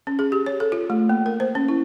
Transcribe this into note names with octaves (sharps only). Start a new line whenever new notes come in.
C#4
G#4
G4
C#5
A4
F4
A3
A#3
A#4
C5
C#4
E4